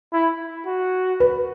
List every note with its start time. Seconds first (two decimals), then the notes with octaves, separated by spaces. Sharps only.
0.13 E4
0.66 F#4
1.20 B4